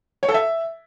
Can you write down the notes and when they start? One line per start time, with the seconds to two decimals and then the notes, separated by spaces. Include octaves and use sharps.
0.23 C#5
0.28 A4
0.34 E5